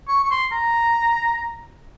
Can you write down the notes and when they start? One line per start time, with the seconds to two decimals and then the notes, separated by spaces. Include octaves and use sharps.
0.08 C#6
0.24 C#6
0.31 C6
0.52 A#5